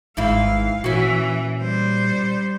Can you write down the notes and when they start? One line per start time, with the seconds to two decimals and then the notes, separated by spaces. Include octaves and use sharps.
0.17 G#1 G#2 E3 E4 F5
0.84 A#2 E3 C#4 F#4
1.61 G3 C5